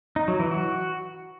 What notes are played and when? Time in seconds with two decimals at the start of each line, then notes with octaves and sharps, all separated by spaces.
0.16 D#4
0.28 F#3
0.40 E3
0.51 F#4